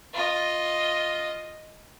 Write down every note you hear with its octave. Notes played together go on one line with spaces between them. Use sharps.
F4 D#5